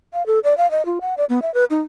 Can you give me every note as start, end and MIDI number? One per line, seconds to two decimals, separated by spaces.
0.13 0.26 77
0.26 0.39 69
0.44 0.56 74
0.57 0.69 77
0.71 0.85 75
0.85 0.99 65
1.01 1.14 78
1.17 1.25 74
1.29 1.42 59
1.42 1.53 76
1.54 1.64 71
1.70 1.81 63